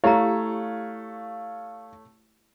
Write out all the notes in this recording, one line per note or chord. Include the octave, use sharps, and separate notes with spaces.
A3 E4 G4 C#5 F5 A#5